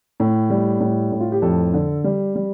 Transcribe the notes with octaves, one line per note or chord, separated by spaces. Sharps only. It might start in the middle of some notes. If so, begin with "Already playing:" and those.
A2
G3
A2
A2
F4
G4
F2 A4
D3
G3
G3